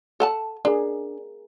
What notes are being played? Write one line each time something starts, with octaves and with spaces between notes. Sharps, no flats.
A4 F#5 A5
D4 G#4 A#4